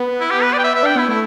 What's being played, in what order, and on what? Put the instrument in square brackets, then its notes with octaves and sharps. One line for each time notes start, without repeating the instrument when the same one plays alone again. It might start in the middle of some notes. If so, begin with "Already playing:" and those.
Already playing: [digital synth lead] B3
[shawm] E4
G4
B4
D5
G5
E5
E5
[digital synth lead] D4 [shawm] G5
[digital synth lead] B3 [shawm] E4
[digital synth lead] A3 [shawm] E4